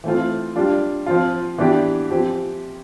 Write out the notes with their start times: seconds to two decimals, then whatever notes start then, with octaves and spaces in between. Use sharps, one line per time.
0.04 E3 A3 C4 F4
0.56 G3 D4 F4
1.06 F3 C4 F4
1.58 E3 B3 D4 G4
2.10 F3 C4 G4